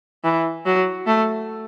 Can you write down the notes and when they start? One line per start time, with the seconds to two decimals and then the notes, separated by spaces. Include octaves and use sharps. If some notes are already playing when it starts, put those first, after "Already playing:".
0.24 E3
0.66 F#3
1.07 A3